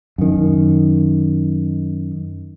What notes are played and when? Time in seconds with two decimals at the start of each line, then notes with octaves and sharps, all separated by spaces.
0.18 F#2 D#3